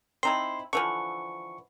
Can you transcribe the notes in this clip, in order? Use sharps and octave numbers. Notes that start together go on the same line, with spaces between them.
C4 D#4 E4 C6
D3 E3 F3 C#6